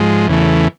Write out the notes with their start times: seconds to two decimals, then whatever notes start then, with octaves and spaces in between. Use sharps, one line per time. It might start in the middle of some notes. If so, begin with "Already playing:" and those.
Already playing: G#2 F3 G#3
0.28 E2 C#3 E3 A3